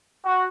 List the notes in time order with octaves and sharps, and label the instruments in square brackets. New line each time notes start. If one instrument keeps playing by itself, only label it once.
[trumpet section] F#4